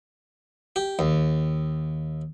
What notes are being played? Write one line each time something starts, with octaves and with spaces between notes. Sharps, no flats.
G4
D#2